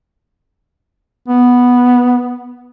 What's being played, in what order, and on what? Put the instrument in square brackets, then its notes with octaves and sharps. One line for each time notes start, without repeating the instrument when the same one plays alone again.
[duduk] B3